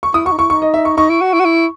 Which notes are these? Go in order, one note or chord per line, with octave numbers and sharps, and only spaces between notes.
C#6
E4 D#6
F#4 C#6
D#4
E4 C#6
D#4 C#6
D#5
E5
C#6
D#4 C#6
E4
F#4
E4
F#4
E4